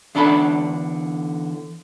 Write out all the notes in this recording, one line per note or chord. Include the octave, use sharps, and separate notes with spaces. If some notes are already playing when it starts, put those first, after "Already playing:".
E2 D3 D4 A4 A#5 B5